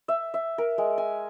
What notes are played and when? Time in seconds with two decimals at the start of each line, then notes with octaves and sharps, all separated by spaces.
0.08 E5
0.34 E5
0.58 A#4
0.78 G#3
0.98 G#5